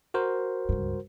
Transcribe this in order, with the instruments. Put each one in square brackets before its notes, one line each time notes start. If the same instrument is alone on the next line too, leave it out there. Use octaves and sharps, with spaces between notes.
[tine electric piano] F#4 A#4 C5
[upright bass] C#2 G2